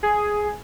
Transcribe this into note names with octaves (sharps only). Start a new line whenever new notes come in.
G#4